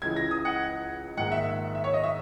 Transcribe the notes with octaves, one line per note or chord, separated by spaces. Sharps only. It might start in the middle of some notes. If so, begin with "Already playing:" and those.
C#2 C#3 E3 G#6
A#6
D#6
F#5
A#1 G#2 D#3 G#3 F#5
E5
E5
C#5
D#5
E5